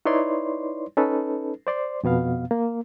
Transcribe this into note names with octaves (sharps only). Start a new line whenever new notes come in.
D#4 E4 B4 C#5 D5 C6
C#4 D#4 A4 B4
C5 D5 C6
F2 B2 B3 F5
A#3